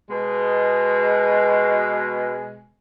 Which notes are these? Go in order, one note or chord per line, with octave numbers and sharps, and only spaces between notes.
B2 G#3